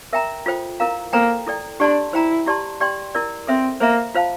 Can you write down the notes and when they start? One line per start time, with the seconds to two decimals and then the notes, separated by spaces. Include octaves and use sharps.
0.13 A#4 E5 G5 A#5
0.46 F4 A4 C5 G5
0.80 E4 A#4 F5 A#5
1.13 A#3 A4 C5 G5 A#5
1.47 E4 A4 D5 G5
1.80 D4 G4 D5 A5 C6
2.13 E4 C5 G5 A#5
2.46 E4 G4 D5 A5 C6
2.80 G4 D5 G5 C6
3.15 E4 A#4 D5
3.47 C4 A4 C5 E5
3.80 A#3 C5 E5 A#5
4.15 F4 C5 F5 A5